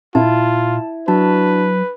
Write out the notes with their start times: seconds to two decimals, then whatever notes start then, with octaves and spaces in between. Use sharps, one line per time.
0.15 A#2 E4 F4 A5
1.08 F#3 D4 F#4 B4 A5